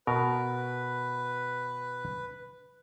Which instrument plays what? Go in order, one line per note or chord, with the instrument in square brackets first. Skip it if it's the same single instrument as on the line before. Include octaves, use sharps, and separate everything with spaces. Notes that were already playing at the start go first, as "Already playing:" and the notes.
[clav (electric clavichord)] B2 A#4 [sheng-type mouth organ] B4